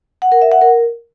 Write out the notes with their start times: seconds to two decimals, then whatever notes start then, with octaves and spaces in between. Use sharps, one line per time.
0.22 F#5
0.32 A#4
0.42 E5
0.52 F#5
0.61 A#4